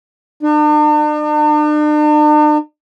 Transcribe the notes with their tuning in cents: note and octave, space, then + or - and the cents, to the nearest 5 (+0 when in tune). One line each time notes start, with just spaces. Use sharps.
D4 +45